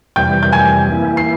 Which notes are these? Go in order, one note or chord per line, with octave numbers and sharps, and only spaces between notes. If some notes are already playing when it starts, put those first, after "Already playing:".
F2 C3 E3 G3 G5 G6
G6
G#5 G#6
E3 A#3 E4
C7